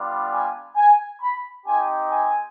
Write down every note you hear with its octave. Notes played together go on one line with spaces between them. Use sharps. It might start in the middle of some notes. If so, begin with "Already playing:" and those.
Already playing: G3 B3 D4 F4
G#5
G#5
B5
C4 D#4 G4 G#5
G#5